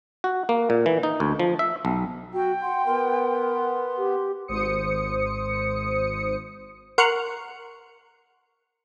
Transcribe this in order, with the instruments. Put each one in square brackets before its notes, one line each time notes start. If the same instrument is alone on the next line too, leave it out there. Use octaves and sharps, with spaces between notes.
[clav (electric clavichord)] F#4
A#3
A#2
E3
D#4
D2
F3
E5
B1
[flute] F#4 [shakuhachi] G5
[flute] F#5 [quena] C6
[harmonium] B3 [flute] A#4 [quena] C6
[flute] G4
[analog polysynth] G#1 C5 D#6 C#7
[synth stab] A#4 F#5 C6 C#6 F6 F#6